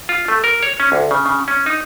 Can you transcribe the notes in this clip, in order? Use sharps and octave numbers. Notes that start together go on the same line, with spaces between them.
F4
A3
A#4
C#5
C#4
D2
C#3
C#3
C#4
D#4